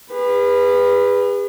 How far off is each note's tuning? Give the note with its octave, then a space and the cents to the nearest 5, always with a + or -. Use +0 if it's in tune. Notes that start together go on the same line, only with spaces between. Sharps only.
G#4 -40 B4 +0